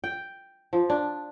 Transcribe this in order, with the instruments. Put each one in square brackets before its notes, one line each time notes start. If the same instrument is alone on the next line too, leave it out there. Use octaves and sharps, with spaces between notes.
[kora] G5
F3
D4